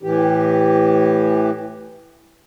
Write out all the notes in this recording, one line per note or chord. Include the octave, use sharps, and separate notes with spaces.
A2 E3 G4